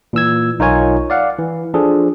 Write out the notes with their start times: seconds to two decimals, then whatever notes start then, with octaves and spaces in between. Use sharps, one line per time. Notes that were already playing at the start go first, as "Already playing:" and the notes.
0.13 A#2 E3 E6 G#6
0.59 B1 D#4 F4 A#4 C#5 G#5
1.10 D5 F5 F#5
1.38 E3
1.74 F3 D4 G#4 A4